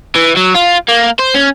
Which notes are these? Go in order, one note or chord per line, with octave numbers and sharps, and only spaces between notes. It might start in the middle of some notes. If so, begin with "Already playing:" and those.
E3
F#3
F4
A#3
C5
C#4